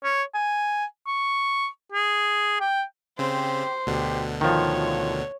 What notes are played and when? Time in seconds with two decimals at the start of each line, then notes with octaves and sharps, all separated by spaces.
0.04 C#5
0.34 G#5
1.07 C#6
1.92 G#4
2.60 G5
3.19 C#3 C4 G4 C5
3.87 D2 B2 D3 G4
4.41 D#3 F3 F4 C#5